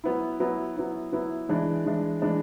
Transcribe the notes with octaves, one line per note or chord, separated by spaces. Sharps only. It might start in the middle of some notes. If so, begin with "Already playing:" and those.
F#3 B3 E4
F#3 B3 E4
F#3 B3 E4
F#3 B3 E4
E3 G#3 D4
E3 G#3 D4
E3 G#3 D4